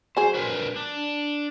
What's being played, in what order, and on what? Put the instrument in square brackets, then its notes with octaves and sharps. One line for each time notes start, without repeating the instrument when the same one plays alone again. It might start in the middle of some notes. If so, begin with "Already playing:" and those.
[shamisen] F#3 G#4 [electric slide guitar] C5
[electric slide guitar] D4 A#4 B4
D4